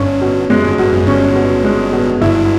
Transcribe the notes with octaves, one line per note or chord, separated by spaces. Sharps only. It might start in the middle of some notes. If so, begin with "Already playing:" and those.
Already playing: G1 G2 C#4
B2
F#2 G#3
G1 G2
G1 G2 B2
F#2
G1 G2 C#4
B2
G#3
B2
G1 G2 E4